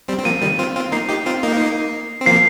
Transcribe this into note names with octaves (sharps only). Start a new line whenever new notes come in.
G3 C4
C4
F3 A#3 D#7
D#3 G3
C4 F4
C4 F4
A#3 D#4 C7
D#4 G4
C4 F4
A#3 D#4
C7
C4
F3 A#3 C7